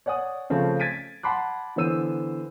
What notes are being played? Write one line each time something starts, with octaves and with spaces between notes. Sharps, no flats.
C#5 D5 F#5 G#5 D#6
C#3 F3 A3 C4 C#4
G#6 A6 B6 D7 D#7
F#5 A5 B5 C6 D6 F#6
D3 E3 B3 C5 E6 D#7